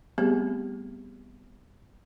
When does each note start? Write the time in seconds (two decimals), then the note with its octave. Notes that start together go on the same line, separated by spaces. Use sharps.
0.18 G3 A3 B3 C4 G4 G#4